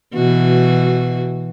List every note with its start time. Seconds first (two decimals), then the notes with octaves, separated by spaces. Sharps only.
0.14 B2 E3 F#4